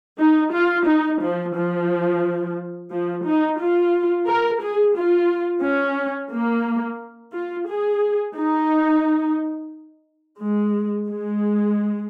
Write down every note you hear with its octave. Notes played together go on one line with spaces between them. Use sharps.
D#4
F4
D#4
F3
F3
F3
D#4
F4
A#4
G#4
F4
C#4
A#3
F4
G#4
D#4
G#3
G#3